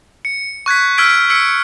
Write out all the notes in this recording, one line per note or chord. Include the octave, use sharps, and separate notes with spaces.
C#7
C#6 F#6 G#6 B6
E6 F6 G#6 B6 D7
E6 B6 C#7 D7